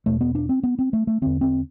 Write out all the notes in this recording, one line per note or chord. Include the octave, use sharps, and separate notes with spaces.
E2 B2 A3
B3
D4
C4
B3
C4
A3
A3
E2 D3 C4
C4